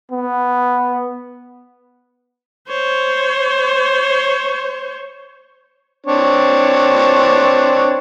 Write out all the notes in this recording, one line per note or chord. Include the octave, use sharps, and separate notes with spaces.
B3
C5 C#5
C4 D4 C#5